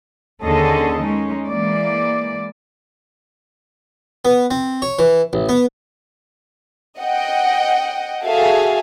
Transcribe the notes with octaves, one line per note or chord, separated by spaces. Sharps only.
D#2 D3 C#4 G#4 A4 D#5
G#3 C#4 D#4
E3 G#3 A#3 D5
B3
C4
C#5
E3
A1
B3
D#5 F#5 G5
F#4 G#4 A4 E5 F5 G#5